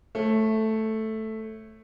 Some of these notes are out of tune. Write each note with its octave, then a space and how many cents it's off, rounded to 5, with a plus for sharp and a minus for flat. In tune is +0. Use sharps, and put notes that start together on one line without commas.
A3 +0 C#5 -40